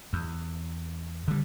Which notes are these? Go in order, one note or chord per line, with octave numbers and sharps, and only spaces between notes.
E2
D3 G3